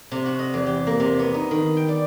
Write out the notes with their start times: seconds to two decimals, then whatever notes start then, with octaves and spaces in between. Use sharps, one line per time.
0.11 C3
0.26 F#4
0.39 D#5
0.54 E2
0.66 G4
0.87 A#3
1.00 C3
1.19 B3
1.34 D#4
1.51 D#3
1.77 G5
1.88 D5